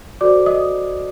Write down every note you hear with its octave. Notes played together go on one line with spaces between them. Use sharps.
F#4 A4 C5 D5 D6
D#5 D#6